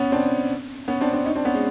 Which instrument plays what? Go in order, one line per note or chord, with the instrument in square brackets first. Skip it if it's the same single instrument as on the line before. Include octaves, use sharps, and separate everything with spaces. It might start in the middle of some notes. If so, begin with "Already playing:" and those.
Already playing: [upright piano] B3 C#4
C4 D4
B3 C#4
C4 D4
C4 D4
C#4 D#4
C4 D4
B3 C#4
G#3